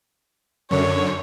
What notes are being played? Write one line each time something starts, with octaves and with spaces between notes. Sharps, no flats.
F#2 D3 C#5